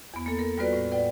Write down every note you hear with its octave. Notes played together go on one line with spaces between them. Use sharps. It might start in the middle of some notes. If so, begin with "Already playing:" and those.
E2 B3
A#3 A4
A4 A#4
G3 B3 F4 F#4 B4 D5
A2
B4 D5 F#5 G5